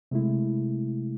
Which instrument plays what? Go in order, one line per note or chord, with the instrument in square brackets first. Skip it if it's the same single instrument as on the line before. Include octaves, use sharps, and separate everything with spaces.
[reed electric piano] C3 G#3 A3 E4